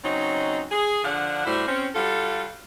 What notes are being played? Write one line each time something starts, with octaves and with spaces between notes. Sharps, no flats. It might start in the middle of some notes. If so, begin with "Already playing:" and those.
C#3 F#3 C4 D#4
G#4
D3 F3 D4 F#5
A2 G3 E4 F#4 C5
C4 C#4
G3 F4 F#4 A4